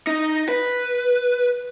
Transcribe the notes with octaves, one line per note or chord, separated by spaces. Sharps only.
D#4
B4